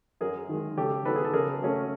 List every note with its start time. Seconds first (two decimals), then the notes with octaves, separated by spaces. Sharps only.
0.21 F#2 G#4 A#4
0.49 D#3 G#3
0.77 C#3 G4 A4
1.05 F#3 B3 D#4 A4 B4
1.16 G#4
1.24 A4
1.33 C#3 G#4 A#4
1.62 F#3 A3 C#4